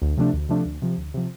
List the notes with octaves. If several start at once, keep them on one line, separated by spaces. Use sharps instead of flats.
D2
C3 F3 A3 D4
D2
C3 F3 A3 D4
D2
C3 F3
D2
C3 F3